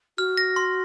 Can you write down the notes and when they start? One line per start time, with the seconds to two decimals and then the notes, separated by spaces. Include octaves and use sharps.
0.18 F#4 F6
0.37 A#6
0.56 C6